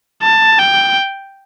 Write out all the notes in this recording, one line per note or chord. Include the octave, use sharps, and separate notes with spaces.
A5
G5